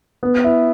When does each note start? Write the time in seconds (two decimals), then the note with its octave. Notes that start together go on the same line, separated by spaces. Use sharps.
0.23 B3
0.44 E4